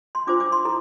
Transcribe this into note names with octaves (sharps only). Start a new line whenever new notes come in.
C6
D4 F4 C5 D6
D6
C6
E4 A4 A#5